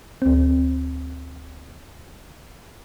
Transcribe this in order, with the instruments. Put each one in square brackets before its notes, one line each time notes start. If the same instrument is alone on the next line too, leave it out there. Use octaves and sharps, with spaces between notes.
[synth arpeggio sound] D2 C4